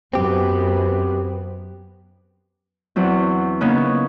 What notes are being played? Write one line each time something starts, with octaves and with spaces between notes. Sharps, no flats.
F#2 B3 C4 G4
E2 F#3 C4
C#3 A#3 B3 C#4 D#4